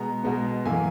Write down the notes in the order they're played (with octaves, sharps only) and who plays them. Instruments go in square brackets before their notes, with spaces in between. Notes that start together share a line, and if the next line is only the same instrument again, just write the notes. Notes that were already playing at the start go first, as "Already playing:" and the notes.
Already playing: [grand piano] B2 G#3 B3 A#5
B2 G#3 B3
F#2 E3 A#3 G#5